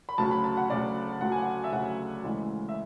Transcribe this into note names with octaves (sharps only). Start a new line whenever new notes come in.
B5
D2 C#3 F#3 A5
B5
A5
F#5
D2 C#3 F#3 D5
D2 C#3 F#3 F#5
G#5
F#5
E5
D2 C#3 F#3 F#5
D2 C#3 E3 G#3
E5